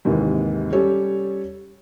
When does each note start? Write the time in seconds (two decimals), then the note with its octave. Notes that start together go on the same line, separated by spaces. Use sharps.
0.05 G#1 D#2 G#2 C3 E3
0.73 G3 C#4 G4 A4 C#5